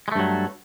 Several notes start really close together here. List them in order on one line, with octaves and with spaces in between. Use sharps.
G#3 A3 G2 F#3